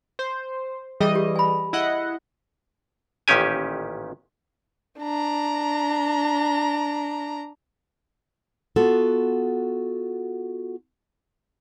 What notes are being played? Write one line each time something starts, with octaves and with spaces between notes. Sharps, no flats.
C5
E3 G3 G#4 D#5
G4
G#5 B5
E4 D#5 F#5
A1 A#2 D#3 C#4 G4 G#5
D4 A#5
B3 F4 F#4 A4